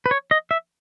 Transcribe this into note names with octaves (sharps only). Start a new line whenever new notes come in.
B4
C#5
D#5
E5